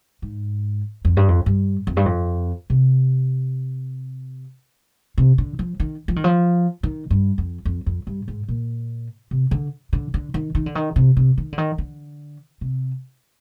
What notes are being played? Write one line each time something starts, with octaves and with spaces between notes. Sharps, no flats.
G#2
F2
G2
F2
G2
F2
G2
F2
C3
C3
D3
F3
D#3
F3
D#3
F3
D#3
G2
F2
F2
F2
G2
G#2
A#2
C3
D3
D3
D3
D#3
D#3
D3
D#3
C3
C3
D#3
D3
D#3
D3
C3